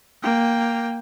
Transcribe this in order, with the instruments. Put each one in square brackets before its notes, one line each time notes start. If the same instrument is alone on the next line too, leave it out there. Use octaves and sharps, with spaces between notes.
[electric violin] A#3 G5